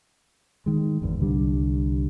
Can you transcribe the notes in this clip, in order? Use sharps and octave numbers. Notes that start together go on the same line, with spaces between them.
D#3 G#3
G#1 E2
C2 D3 G3